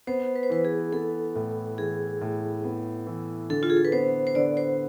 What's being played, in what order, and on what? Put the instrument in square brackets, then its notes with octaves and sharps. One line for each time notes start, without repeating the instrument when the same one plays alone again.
[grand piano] B3 [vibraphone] C5
[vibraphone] B4
C5
[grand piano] E3 [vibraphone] B4
[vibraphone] G#4
[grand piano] B3 [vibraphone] A4
[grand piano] A2
[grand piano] E3 [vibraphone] G#4
[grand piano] A2
B3
E3
[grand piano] D3 [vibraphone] A4
[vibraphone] F4
G#4
A4
B4
[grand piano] B3 [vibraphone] C5
[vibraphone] C5
[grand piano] D3 [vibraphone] D5
[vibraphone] C5